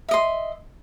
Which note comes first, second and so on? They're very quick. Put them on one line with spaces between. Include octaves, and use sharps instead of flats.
E5 D#5 C6